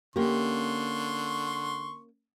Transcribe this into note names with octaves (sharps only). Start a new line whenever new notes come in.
D3 A#3 C#4 G4 C6 C#6